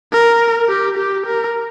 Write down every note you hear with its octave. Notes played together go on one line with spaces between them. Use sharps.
A#4
G4
G4
A#4